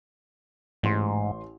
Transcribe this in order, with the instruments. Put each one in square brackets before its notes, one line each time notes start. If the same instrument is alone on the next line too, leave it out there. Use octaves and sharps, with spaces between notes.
[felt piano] A1 C6 [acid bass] G#2